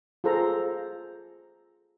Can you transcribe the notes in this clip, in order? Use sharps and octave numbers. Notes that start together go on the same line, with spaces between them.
F4 G#4 A4 C5 A#5